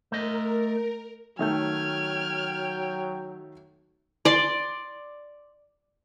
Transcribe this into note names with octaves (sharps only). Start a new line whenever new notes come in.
A3 A#4 D#5
D#3 F#3 A3 G5 F6 G6 G#6
D5 C6